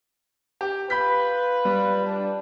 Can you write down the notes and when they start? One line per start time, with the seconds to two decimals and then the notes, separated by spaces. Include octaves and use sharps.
0.61 G4
0.90 F4 B4 B5 G6 B6
1.65 G3
2.05 D4